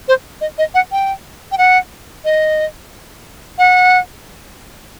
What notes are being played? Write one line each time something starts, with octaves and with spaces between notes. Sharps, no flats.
C5
D#5
D#5
F#5
G5
G5
F#5
D#5
F#5